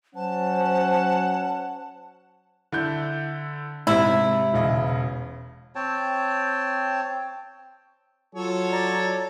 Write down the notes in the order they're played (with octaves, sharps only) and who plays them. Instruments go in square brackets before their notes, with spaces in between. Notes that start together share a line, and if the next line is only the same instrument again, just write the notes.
[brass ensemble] F#3 C#4 [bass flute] C5 [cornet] F#5 [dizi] A5
[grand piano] D3 E4 G6
[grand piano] G#2 C3 [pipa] E4
[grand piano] E1 C#3 D#5
[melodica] C4 C#5 G5 A5
[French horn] F#3 [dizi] F4 [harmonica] A4 C#5
[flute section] D5 A#5